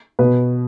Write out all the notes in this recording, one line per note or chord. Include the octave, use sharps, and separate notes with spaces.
B2 B4